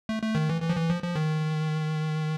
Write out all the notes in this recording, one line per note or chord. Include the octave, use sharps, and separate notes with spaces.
A3
A3
D#3
E3
E3
F3
E3
F3
F3
D#3